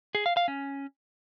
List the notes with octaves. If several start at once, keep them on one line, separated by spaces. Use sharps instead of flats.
G#4
F5
F5
C#4